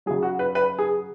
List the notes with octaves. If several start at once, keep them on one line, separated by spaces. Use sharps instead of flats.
C#3 F#3 G#4
F#4
B4
B4
G#4